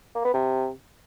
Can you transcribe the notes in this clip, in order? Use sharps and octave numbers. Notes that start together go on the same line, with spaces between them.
A#3
B3
C3